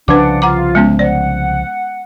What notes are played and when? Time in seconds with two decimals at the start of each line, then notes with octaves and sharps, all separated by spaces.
0.08 C2 C#3 F3 D4 B4 F#5 D6
0.42 F4 F#5 A#5 D6
0.75 G#3 B3 C#4
0.99 C5 D5 F#5